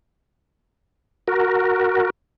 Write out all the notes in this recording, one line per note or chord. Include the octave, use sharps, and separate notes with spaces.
F#4 A#4